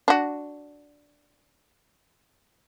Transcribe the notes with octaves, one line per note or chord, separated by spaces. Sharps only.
D4 F#4